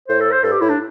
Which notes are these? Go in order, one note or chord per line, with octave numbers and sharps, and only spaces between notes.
A2 C5
A4
C5
G2 A4
G4
A2 E4
D4